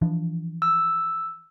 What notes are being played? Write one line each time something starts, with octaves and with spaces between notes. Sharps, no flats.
E3 F3 D4
E6